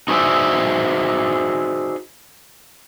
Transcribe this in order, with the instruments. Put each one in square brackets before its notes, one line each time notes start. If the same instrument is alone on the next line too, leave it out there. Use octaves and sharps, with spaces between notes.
[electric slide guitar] D#4 F#4 G#4 C5 D5 E5